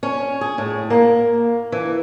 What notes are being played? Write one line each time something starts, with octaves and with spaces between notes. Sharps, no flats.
C#4
G#4
A2
A#3
E3